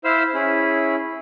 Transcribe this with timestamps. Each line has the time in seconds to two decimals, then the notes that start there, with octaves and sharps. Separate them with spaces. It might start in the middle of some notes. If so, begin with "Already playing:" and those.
0.04 E4 C5 F5 B5 C6 E6
0.34 C#4 E4 G#4 B5